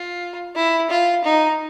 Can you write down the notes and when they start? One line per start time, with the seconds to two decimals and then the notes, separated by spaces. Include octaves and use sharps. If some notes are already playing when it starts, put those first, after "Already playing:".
Already playing: F4
0.56 E4
0.90 F4
1.24 D#4